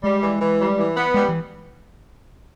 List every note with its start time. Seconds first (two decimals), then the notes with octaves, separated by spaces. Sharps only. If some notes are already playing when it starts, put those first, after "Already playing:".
0.03 G3 G#3
0.22 E3
0.40 E3
0.59 G3
0.77 E3
0.96 B3
1.14 G3 G#3
1.29 E3